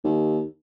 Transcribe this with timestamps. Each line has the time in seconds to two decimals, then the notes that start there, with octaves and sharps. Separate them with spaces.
0.04 D#2